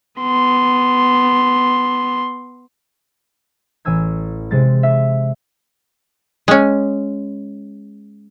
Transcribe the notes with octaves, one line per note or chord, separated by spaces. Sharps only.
B3 C6
A1 G#5 E6 G#6
C3 G#3 A6
E5
G#3 C#4